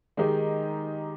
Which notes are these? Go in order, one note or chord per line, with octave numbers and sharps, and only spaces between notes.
D#3 G#3 D#4 G4